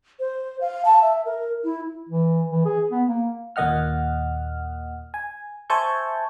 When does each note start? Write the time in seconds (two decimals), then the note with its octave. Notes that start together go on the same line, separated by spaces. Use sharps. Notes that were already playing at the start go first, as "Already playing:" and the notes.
0.20 C5
0.61 F5
0.85 A5
1.02 E5
1.26 A#4
1.64 E4
2.09 E3
2.51 E3
2.65 G#4
2.91 B3
3.08 A#3
3.56 D#2 A#2 A#3 D#5 F#5 F6
5.14 G#5
5.70 C5 E5 G#5 A5 C#6 G6